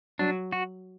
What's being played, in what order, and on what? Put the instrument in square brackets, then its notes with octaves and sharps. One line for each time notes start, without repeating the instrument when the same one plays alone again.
[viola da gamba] F#3 [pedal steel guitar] D4
[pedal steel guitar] F#4